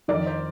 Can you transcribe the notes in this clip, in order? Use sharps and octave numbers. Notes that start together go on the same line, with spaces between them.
F2 D#3 A#4 D5
C5